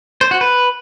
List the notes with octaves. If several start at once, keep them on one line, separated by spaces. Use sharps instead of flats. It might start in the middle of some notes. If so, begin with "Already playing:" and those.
C5
F#4
B4